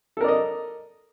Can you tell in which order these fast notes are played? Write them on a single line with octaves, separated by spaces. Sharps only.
A4 A#4 D5 D#5